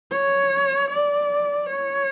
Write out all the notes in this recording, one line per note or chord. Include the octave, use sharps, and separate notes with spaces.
C#5
D5
C#5